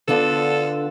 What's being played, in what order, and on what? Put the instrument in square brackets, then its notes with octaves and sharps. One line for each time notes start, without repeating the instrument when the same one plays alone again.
[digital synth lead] D3 [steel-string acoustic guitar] B3 D4 F4 [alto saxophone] A4